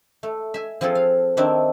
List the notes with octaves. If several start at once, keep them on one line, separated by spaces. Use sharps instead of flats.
A3
E5 G#5
F3 C4 F4 G#4 A4
F5
D#3 C4 D4 E4